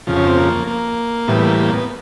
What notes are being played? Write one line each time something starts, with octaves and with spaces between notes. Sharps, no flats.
F2 C#3 F3
C#4
C4
A#3
A#3
A2 E3 G3 B3
A#3
A#3
B3